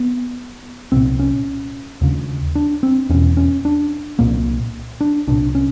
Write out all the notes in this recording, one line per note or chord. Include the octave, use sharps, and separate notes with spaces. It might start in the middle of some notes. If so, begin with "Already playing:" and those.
Already playing: B3
C2 A#2 C4
C#4
D#2 C#3
D4
C4
E2 B2 C#4
C#4
D4
C2 A#2 A#3
D4
C2 A#2 D4
C#4